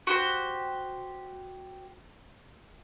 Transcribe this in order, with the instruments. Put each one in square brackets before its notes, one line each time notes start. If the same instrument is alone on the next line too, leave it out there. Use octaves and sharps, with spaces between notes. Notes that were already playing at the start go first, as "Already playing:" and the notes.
[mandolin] F#4 G4 C5